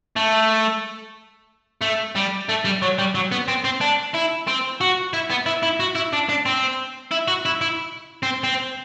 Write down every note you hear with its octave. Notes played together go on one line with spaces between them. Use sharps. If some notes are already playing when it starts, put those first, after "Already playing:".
A3
A3
G3
A3
G3
F#3
G3
F#3
B3
C4
C4
D4
E4
C4
F#4
E4
B3
E4
E4
F#4
E4
D4
D4
C4
E4
F#4
E4
E4
C4
C4